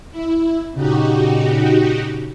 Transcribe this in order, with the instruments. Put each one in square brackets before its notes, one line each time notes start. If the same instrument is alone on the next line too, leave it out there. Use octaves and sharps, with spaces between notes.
[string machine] E4
[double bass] A#2 C#3 [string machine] D#4 F#4 G4